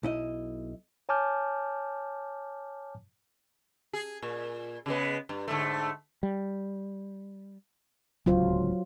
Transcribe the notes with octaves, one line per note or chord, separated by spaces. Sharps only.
B1 E4 D#5
C#5 G#5 A5 D6 F6 G6
G#4
A#2
C#3 G#3 B3
G2
G#2 D3 A3
G3
D1 C#2 F#3 F4 C5